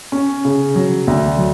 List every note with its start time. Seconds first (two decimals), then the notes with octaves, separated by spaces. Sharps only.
0.12 C#4
0.45 C#3
0.76 F#3
1.07 D2
1.38 F#3